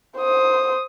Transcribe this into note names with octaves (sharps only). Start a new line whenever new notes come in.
C5 D#6